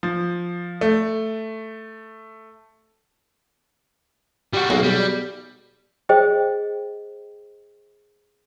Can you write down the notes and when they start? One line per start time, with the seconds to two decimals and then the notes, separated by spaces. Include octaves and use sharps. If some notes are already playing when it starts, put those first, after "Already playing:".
0.03 F3
0.81 A3
4.54 G3 F#4
4.70 B1 A#3 G#4 A#4
4.83 G3 B3 G#4
6.09 G#4 C5 D#5 G5